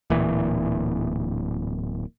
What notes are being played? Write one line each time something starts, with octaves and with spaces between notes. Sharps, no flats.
D1 A#2 E3